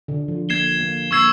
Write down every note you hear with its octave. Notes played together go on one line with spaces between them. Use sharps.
D3
F3
A#3 G#6 C7 E7 G7
A#3
A#3 C#6 E6 G#6 C7